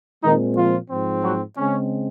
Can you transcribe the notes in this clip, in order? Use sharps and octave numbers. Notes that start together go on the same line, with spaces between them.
A#2 D#3 G#3 C4 D#4
F3 F4
G#2 F3 C4
F#3 F#4
C#3 G#3 C4 C#4